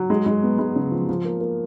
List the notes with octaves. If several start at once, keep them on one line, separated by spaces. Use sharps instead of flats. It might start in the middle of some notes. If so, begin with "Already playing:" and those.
Already playing: F#3
G#3
G#3
B3
G#3
C#3
F3
F3
A#3
A#3